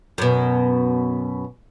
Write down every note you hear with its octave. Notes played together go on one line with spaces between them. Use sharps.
F#2 B2